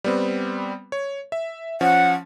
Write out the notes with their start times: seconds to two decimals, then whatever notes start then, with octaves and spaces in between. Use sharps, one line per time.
0.04 G3 B3 C4
0.92 C#5
1.32 E5
1.81 F3 C#4 F#5